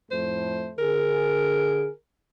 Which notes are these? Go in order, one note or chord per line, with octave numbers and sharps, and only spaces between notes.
F2 A2 A3 C5
D3 G#4 A#4